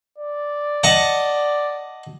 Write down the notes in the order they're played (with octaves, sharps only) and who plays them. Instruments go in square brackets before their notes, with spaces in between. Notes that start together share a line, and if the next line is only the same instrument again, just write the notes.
[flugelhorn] D5
[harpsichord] D#5 F#5 A5